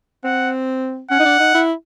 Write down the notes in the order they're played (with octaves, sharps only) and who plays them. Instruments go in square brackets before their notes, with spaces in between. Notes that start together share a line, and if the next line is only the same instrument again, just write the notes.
[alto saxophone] C4 [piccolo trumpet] F#5
[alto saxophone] C#4 [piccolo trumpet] F#5
[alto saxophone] D#4
D4
D#4
E4